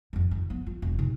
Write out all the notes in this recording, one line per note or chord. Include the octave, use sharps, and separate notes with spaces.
F2 D#3
D#3
F3 B3
F4
E1
C3 D#4